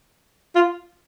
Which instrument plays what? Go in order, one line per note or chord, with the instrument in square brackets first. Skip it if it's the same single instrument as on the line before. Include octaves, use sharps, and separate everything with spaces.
[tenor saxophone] F4